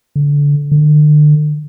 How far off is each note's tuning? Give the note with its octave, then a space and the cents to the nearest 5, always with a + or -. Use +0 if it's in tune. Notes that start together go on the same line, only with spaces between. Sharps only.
D3 -25
D3 +35